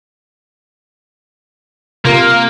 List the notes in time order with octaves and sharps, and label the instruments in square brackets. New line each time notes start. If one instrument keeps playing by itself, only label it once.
[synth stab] C3 F4 A#4 [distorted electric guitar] A#3